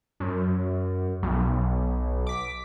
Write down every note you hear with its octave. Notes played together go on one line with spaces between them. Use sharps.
F#2
B1
D6 B6